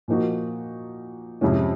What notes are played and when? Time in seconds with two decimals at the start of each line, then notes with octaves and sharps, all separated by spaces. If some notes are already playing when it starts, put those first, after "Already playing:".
0.08 A#2 F3 A#3 D#4 F#4
1.41 F2 C3 F3 G#3 C#4